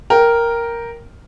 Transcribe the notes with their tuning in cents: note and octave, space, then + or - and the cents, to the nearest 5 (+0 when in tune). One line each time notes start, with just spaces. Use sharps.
A#4 +0 G5 +0